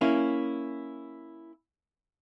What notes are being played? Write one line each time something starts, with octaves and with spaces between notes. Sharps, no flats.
A#3 C#4 E4